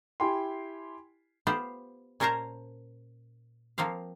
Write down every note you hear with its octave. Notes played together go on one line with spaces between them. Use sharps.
E4 G4 G5 G#5 B5 C6
B3 F4 G4 C5
A#2 C#4 A#4 C5 A5 A#5
F3 A#3 C4 F5